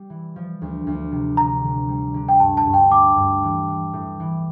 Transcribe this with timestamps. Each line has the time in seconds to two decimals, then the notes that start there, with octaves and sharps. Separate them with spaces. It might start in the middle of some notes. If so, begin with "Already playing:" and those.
Already playing: G3
0.10 E3
0.36 F3
0.62 D2
0.87 D2
1.12 C3
1.37 D3 A#5
1.64 D3
1.88 G3
2.14 D3
2.29 G5
2.40 G2 A5
2.57 A5
2.66 G2
2.74 G5
2.91 A3 D6
3.17 G2
3.43 E3
3.68 E3
3.93 A2
4.20 E3